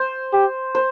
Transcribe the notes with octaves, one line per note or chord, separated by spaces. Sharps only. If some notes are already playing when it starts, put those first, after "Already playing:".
Already playing: C5
G4
C5